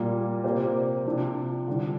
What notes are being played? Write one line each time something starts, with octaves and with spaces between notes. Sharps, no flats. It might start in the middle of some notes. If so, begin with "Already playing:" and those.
Already playing: A#2 G3 A#3
C3 A#3 G4 C5
C3 F3 D4
D3 G3 D4